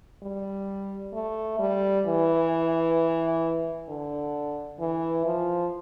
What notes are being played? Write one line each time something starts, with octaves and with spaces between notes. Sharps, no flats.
G3
A3
G3
E3
D3
E3
F3